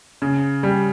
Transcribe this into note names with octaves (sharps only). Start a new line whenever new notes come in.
C#3
G3